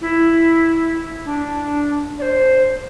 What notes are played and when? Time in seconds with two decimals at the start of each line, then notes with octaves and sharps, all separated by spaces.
0.01 E4
1.25 D4
2.19 D5
2.22 C5